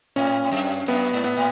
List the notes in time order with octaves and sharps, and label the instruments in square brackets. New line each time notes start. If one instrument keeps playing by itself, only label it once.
[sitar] A2 [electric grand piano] C#4
[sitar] F#2
[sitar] F#2 [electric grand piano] B3
[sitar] G#2
[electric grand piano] B3
[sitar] A2